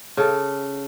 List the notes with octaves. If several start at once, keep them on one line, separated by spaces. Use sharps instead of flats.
C#3 A4